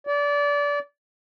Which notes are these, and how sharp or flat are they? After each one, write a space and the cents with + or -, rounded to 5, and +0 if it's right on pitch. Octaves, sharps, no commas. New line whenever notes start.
D5 -25